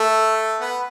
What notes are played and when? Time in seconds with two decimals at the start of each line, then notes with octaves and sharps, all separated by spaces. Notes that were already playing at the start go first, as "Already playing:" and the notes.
Already playing: A3 A4
0.60 B3 B4